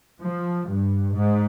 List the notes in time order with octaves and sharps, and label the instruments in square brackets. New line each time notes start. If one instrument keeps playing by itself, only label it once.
[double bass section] F3
G2
G#2